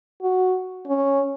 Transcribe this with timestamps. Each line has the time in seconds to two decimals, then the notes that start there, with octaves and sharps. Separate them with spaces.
0.22 F#4
0.87 C#4